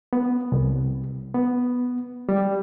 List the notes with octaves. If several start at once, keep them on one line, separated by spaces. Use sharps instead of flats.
B3
C2
B3
G3